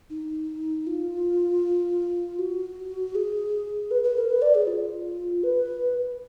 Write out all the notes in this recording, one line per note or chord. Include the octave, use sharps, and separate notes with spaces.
D#4
F4
F#4
G#4
B4
B4
A#4
B4
D5
G#4
F4
B4